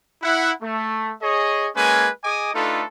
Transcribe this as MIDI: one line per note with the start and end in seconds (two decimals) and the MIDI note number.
0.22 0.52 64
0.22 0.52 78
0.62 1.11 57
1.21 1.68 68
1.21 1.68 73
1.21 1.68 75
1.76 2.09 56
1.76 2.09 58
1.76 2.09 61
1.76 2.09 71
1.76 2.09 80
2.24 2.53 68
2.24 2.53 75
2.24 2.53 80
2.24 2.53 86
2.24 2.53 87
2.54 2.83 57
2.54 2.83 62
2.54 2.83 63
2.54 2.83 65
2.54 2.83 69
2.54 2.83 71